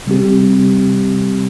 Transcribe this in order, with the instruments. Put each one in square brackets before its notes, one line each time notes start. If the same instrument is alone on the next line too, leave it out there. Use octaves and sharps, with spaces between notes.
[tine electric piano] C3 G3 C4 G4